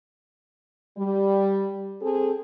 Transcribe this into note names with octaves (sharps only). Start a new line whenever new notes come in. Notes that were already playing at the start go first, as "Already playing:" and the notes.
G3
C4 G#4 A4